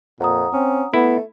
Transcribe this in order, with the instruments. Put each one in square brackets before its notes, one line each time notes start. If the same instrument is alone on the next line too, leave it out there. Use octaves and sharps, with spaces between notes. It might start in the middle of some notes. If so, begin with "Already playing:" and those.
[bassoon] F2 [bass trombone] A#2 [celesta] F#5 A#5 D#6
[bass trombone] C4 [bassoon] C#4
[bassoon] A3 [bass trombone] B3 [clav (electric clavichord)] E4